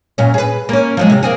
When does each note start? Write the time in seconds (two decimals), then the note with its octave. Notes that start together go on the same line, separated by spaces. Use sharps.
0.18 F#2 A#2 C#4
0.34 G#4 B4
0.69 A#3 C#4
0.97 F3 F#3 G#3
1.10 C3
1.23 A#3 C4 G#4